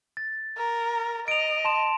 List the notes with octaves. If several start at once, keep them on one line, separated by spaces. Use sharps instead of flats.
A6
A#4
D#5 D7 F7
A5 C6 E7